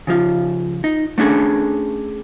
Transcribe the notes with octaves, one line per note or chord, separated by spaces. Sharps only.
C#3 F3 F4
D#4
A3 C#4 D4 G#4 A4